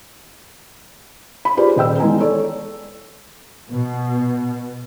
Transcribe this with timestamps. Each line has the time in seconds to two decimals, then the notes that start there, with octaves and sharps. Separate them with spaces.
1.45 B5
1.57 F4 G4 G#4 B4 C5 D5
1.76 D#1 D#5 G5 E6
1.99 E3 G#3 B3 G#5 A#5
2.20 A4 C#5 D5
3.70 B2